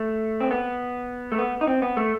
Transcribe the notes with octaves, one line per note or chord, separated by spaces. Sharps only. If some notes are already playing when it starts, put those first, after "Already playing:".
Already playing: A3
C4
B3
A3
B3
D#4
C4
B3
A3